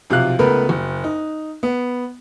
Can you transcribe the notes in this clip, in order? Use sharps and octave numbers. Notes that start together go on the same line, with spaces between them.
B1 C3 F3 F5 F#6
C#2 A3 B3 A#4 B4
F#1
D#4
B3